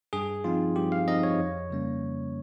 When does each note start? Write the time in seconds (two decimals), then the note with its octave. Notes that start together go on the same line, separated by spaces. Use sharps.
0.13 G2 G#4
0.44 F3 C4 D#4 F4
0.76 G2 G4
0.92 F5
1.08 F3 C4 D#4 D#5
1.23 C#5
1.39 F2
1.71 C#3 G3 A#3 C#4